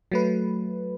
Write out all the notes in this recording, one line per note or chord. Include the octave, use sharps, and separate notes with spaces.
F#3 A3 B4